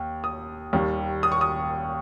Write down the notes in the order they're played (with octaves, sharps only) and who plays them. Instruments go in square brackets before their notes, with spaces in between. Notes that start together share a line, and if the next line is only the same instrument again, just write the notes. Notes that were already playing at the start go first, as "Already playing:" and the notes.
Already playing: [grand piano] D#2
D#6
D#2 D#3 G3
D#6
C#6
D#6